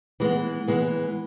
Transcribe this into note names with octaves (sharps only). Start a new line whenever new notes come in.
E3 G#3 B3
E3 G#3 B3